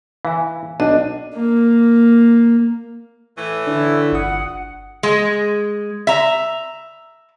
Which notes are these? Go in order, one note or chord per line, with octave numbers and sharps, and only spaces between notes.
E3 F5 G#5
B1 D4 D#5
A#3
A2 E3 A3
D3 E4
G1 F#5 D#6
G#3
E5 A#5